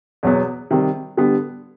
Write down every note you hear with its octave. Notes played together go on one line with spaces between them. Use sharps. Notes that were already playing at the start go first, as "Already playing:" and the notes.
E2 B2 F#3 B3
C3 D#3 G3
D3 G3 B3